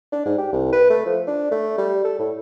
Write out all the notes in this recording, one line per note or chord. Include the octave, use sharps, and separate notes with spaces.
D4
G#2
G4
C2
B4
A3
F3
D4
A3
G3
A4
A2